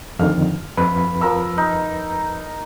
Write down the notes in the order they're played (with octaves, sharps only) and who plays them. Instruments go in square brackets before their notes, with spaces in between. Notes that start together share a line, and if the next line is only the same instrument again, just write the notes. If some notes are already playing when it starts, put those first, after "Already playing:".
[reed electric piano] F2 D3 D#3 [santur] F5
[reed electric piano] F2 B4 B5
[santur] F3 A#4 E6
D#4